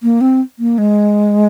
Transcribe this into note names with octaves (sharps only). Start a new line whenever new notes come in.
A#3
C4
A#3
G#3